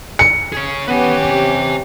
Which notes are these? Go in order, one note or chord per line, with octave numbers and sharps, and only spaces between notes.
C#7
G#4 C#5
B3 C#4 G4 B4 G#5
C3